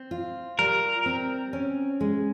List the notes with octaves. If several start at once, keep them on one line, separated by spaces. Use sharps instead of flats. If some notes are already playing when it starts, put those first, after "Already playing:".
Already playing: C4
F4
G3 A#4
C4
C#4
G#3